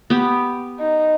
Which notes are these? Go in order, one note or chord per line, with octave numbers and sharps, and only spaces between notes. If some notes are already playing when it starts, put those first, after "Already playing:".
B3 G4
D#4